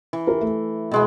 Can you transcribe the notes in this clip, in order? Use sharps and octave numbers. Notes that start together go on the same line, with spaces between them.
E3
G4 A#4
A3
B2 G#3 B3